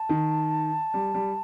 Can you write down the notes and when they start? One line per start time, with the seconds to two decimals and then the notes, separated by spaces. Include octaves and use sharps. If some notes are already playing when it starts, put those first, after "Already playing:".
Already playing: A5
0.09 D#3
0.94 G3
1.14 G3